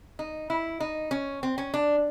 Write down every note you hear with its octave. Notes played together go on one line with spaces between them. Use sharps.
D#4
E4
D#4
C#4
C4
C#4
D4